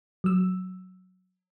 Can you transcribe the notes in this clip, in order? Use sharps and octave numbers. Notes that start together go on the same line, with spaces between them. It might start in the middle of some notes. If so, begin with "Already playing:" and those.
F#3 E6